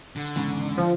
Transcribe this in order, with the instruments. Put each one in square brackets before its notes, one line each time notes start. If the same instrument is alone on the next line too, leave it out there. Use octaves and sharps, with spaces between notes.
[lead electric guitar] D3
[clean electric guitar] E2 G#2 C#3
[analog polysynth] F3